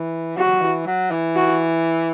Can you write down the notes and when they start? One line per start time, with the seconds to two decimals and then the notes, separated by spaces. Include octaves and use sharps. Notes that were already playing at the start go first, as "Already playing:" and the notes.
Already playing: E3
0.37 F#3 F#4
0.61 E3
0.86 F#3
1.11 E3
1.36 F#4